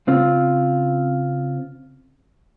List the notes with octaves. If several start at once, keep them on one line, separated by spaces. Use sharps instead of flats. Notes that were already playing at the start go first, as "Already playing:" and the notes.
C#3 C4 F4